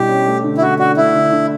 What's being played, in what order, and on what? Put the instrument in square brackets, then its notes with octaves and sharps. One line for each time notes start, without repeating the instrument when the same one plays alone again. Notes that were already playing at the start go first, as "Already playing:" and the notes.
Already playing: [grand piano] B2 G3 D4 E4 [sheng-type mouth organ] G4
[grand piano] C#4
A3
D3
[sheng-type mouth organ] E4
[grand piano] D3 [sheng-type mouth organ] F#4
[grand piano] D4 [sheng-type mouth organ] F#4
[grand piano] A3 [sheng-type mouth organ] E4
[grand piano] D3
D3